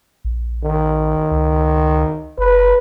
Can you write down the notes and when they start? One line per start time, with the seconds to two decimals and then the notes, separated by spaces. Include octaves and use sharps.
0.25 A#1
0.63 D#3
1.31 C#2
2.38 F#1 B4